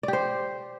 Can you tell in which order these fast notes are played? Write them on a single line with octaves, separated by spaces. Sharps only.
D5 G4 C5